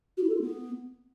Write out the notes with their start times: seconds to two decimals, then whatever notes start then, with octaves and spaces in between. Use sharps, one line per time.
0.17 F#4
0.23 E4
0.29 A4
0.35 F4
0.41 B3